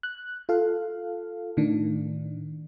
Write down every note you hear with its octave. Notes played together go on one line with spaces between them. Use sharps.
F#6
F4 A4 F5
A2 D#3 D4